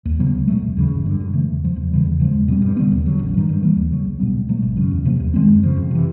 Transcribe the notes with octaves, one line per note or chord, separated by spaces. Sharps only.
D#2
C#3 F#3 B3
C#2
B2 F#3 A3
E1
D#2 C#3 E3
G1
G2 D3
F#2
C#3 E3 A3
E2
C#3 F3
E2
C#3 E3 G3
E2
C#3 F3 G#3
E2
B2 G3 C4
G2
D3 G3 B3
D#2
D3 F#3
A1
G2 D#3
G2
E3 G3 A#3
D#2
C#3 F#3
B1
B2 G3 B3
C#2
B2 F#3 A3
G#1
F#2 C#3
E2
C3 F3 A#3
D#2
D#3 G#3 C4
F#2
C#3 F3
F2
C3 E3